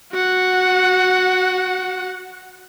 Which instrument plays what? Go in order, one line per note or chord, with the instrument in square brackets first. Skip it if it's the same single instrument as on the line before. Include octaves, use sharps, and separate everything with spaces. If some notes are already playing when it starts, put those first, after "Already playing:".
[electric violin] F#4 F#5